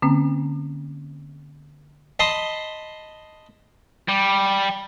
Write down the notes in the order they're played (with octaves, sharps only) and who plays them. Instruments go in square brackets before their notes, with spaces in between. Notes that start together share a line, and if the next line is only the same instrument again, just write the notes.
[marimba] D3 A#3 C4 C#4
[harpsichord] D#5 A5 B5 C6 D#6
[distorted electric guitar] G3